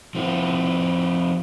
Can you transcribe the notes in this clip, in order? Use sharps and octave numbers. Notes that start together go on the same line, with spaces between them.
F3 C4 E4